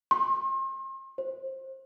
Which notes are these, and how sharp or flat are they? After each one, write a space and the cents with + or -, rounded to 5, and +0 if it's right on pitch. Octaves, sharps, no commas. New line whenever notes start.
C6 +40
C5 +25